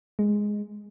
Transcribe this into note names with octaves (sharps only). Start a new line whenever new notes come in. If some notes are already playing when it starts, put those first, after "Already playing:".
G#3